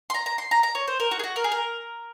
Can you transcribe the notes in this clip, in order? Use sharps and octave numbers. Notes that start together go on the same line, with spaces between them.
C6
A#5
A#5
C6
A#5
A#5
C#5
C5
A#4
F#4
G#4
F#4
A#4
G#4
A#4